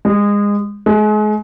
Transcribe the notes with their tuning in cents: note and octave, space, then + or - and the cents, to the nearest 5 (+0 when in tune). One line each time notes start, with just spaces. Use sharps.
G#3 -25
G#3 +35